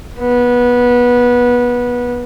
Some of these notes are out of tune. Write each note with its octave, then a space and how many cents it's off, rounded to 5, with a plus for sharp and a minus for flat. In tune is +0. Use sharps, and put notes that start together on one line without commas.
B3 -20